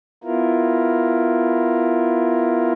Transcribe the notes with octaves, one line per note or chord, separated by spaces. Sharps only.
B3 E4 F4 A#4